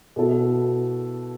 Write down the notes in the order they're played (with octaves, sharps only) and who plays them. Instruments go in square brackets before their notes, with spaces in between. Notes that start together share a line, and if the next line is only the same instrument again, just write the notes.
[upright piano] B2 B3 E4 A4